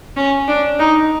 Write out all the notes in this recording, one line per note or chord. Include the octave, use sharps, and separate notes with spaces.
C#4
D4
D#4